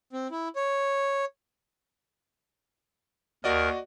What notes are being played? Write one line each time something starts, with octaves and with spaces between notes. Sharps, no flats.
C4
E4
C#5
D#2 F#4 A#4 D5 D#5